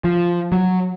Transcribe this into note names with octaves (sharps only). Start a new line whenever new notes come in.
F3
F#3